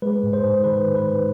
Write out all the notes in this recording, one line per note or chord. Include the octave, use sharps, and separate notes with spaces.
G#3 B4
G#2
C5
G#2
D#3 B4
G#2
B4
G#2